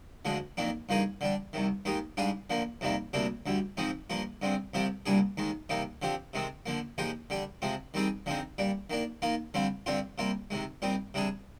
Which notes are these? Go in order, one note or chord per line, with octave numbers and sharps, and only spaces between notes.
D2 D3 F3 G#3 D4
F2 D#3 A#3 D4
G2 F3 A#3 D#4 G#4
D3 G3 D4
C2 C3 D#3
D#2 D#3 G#3 D#4 G4
G#2 G3 D4 F4 G#4
D3 F3 A#3
F2 C3 D#3 G3 A#3
D2 C3 G3 A#3 D4
D2 D3 G3
G#2 F3 G#3 C4 D#4
G2 F3 A#3 F4
G2 D3 G#3 C4
C2 C3 F3 C4 G4
C2 A#2 G3 D4 G#4
D#2 D#3 G#3
C3 G3 A#3 D#4
D3 F3 C4 G4
C3 D#3 G#3 C4
D3 F3 A#3
A#2 F3 G#3 D#4 G4
D3 G3 D4
C3 F3 G#3 C4
D#3 G3 C4 D#4 G#4
D3 F3 G#3 C4 D#4
A#2 G3 D4
D#3 A#3 D4
D#3 A#3 F4
D3 G3 C4 F4
G2 D3 G3 C4 F4
C3 G3 A#3 F4
C3 D#3 G#3
A#2 G3 C4 D#4
C3 G3 D4 G#4